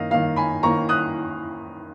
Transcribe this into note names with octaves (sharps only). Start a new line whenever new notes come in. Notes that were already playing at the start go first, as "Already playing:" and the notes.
Already playing: D#3 A#3 D#5 F5
D#3 A#3 F5
G#5 B5
D#3 A#3 A#5 C#6
D#6 F#6